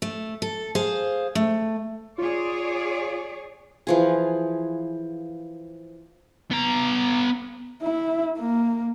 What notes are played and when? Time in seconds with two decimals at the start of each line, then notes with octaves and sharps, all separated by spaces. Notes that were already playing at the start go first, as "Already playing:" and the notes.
0.02 A3
0.42 A4
0.75 G#4 C5 F5
1.35 A3
2.18 F4 G#4 C#5 D5
3.87 E3 F3 G#4
6.51 B3 A#5
7.83 E4
8.37 A#3